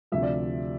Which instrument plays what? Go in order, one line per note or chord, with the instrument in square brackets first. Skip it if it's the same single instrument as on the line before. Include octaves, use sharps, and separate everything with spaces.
[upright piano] D2 C3 F3 E5
D5